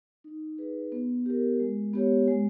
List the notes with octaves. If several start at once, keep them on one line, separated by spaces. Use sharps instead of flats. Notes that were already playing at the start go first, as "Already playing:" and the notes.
D#4
G#4 B4
B3
G4 A#4
G#3
B3 G4 C#5
G#3